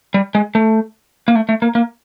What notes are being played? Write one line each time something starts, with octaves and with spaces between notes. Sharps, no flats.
G3
G#3
A3
A#3
A3
A3
A#3
A#3